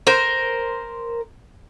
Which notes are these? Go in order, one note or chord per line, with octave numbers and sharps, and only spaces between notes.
A#4 C5